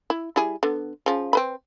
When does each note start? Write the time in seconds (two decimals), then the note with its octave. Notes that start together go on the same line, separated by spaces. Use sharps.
0.10 E4
0.36 G3 E4 G#4
0.63 D3 B3
1.06 C#3 F3
1.33 C4 B4 B5